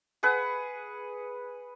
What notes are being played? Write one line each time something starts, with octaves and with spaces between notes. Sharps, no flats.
G#4 B4 F#5